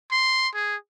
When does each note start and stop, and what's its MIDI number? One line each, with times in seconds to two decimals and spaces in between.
0.11 0.48 84
0.54 0.75 68